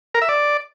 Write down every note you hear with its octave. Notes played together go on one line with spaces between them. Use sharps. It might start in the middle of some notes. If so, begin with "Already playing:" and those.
A#4
E5
D5